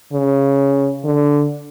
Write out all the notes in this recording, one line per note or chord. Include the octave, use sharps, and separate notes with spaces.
C#3
D3